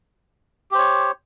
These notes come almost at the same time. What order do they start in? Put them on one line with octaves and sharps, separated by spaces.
G4 C5 C#5